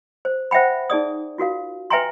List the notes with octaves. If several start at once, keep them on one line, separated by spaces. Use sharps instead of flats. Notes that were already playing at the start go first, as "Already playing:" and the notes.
C5
C5 E5 F#5 G5 B5
D#4 G#4 D5 D#6
F4 F#4 A#4 F5
B4 E5 G5 G#5 A#5 C6